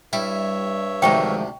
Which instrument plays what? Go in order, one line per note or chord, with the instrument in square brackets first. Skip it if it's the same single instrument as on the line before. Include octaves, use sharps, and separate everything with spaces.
[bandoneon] G2 C#5 E5 [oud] G3 [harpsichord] E4
[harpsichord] D2 C3 [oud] D#3 F3 G#3 [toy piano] G5 C#6